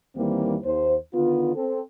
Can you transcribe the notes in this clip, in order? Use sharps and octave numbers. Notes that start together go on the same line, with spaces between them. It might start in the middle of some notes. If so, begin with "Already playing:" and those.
D#2 D#3 E3 G3 A#3 C4
D#2 C5
D3 D#3 B3 F4
C4 A4